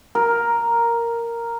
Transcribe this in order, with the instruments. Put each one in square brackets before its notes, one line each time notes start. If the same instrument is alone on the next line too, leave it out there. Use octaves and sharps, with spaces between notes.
[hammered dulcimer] A#4